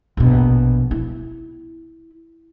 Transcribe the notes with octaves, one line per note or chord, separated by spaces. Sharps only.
A#1 B2
E4